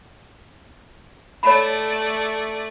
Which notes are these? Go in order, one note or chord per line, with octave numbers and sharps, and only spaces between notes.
A3 C#5 D5 B5